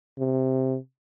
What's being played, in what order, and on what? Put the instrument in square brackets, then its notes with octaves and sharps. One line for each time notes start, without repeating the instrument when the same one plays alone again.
[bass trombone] C3